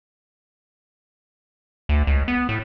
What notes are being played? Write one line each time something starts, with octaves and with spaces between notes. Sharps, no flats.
D2
C#2
B3
A2